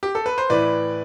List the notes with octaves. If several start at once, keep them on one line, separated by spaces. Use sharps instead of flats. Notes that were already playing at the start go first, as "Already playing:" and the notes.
G4
A4
B4
C5
A2 E3 B4 D5